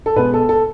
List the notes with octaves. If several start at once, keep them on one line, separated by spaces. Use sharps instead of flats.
A4
B2 G#3 B3 B4
A4
A4